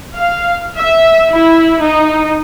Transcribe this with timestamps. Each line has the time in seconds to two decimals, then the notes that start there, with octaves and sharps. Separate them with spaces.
0.14 F5
0.75 E5
1.30 E4
1.80 D#4